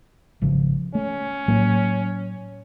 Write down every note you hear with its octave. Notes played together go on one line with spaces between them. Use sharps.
G#1 C#3 F3
A3 C#4
A2 F#3 A#3